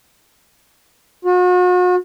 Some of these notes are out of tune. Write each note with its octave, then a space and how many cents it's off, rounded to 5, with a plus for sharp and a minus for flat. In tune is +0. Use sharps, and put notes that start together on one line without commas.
F#4 -40